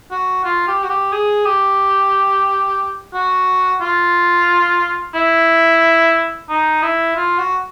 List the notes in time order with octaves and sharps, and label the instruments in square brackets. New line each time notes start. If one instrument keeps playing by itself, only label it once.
[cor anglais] F#4
F4
G4
F#4
G4
G#4
G4
F#4
F4
E4
D#4
E4
F4
F#4